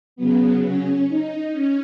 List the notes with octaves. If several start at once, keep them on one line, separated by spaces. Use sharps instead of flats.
C#3 F#3 B3
C#4
D#4
C#4